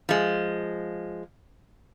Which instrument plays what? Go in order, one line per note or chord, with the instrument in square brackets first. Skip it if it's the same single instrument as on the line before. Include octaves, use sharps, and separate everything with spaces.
[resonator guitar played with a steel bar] F3 G#3